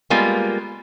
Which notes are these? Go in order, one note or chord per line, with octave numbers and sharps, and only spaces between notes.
G3 G#3 A#3 B3 F4